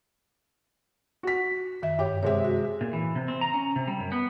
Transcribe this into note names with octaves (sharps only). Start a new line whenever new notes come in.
F#4 B6
F#2 D#3 E5
G2 G4 C#5
C3 G#3 C#5 E5
F#4
A#2
E3
C3
C4
A#5
C#4
C3
G3
F#2
B3